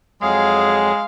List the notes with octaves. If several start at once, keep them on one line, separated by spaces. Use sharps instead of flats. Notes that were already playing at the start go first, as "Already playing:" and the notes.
F2 F#3 G#3 G#4 F5